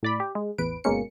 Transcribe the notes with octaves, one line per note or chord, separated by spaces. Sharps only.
A2 D5 B5
G4
G#3
A1 E2 B4 D7
G1 B2 G#3 A#3 C#4 C#7